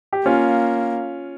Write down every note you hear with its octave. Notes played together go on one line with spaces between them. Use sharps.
G4
A#3 C#4 F4